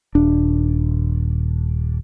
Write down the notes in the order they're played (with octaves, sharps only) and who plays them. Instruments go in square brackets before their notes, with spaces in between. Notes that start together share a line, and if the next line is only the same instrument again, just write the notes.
[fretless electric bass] D#1 D4